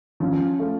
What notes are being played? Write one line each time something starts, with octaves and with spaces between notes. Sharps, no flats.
F3 C#4
A3